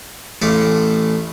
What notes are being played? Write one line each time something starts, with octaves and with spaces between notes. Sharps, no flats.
A1 A2 A3 A4 F5 D6